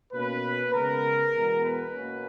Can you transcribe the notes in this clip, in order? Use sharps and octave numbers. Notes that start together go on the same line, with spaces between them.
B2 A#3 C#4 B4
C#3 G#3 B3 A#4
E2 B2 G#3 B3
B4
B2 A#3 C#4